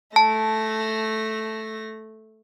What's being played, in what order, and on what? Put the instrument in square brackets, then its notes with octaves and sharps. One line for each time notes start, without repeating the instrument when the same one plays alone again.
[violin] A3 A#6 [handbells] A5